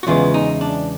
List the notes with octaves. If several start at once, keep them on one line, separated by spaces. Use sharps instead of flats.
F#4
E2 C#3 E3 G#3 B3 F4
D#4
D4